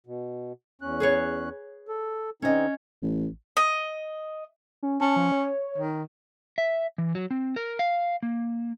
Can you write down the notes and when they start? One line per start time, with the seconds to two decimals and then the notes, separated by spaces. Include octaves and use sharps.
0.07 B2
0.82 E2 C#4 F#6
1.00 G#4 B4 C#5
1.88 A4
2.42 D3 C4 C#4 D#4 D#5
3.02 A1
3.57 D#5
4.83 C#4
5.01 C#4 A5
5.16 F3
5.32 C#5
5.78 D#3
6.58 E5
6.98 E3
7.15 F#3
7.31 C4
7.56 A#4
7.79 F5
8.23 A#3